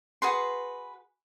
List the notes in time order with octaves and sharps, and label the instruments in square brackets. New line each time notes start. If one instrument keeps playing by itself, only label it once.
[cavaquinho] F#4 G#4 B4 C6